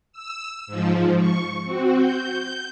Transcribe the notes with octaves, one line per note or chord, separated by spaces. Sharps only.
E6
G#2 F3
C#6
C4 F#4
G6